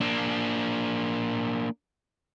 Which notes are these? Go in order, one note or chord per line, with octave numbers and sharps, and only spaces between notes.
A#3 D4